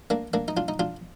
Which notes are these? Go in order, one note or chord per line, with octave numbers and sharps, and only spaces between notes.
A#3 D4
A#3 D4
D#4
D4 F4
D#4
D4 F4